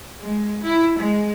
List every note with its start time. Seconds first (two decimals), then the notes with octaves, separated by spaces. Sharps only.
0.20 G#3
0.63 E4
0.98 G#3